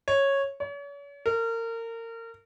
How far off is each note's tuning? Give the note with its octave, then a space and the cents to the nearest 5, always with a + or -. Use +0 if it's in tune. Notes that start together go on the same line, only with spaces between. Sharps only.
C#5 -10
C#5 +40
A#4 -30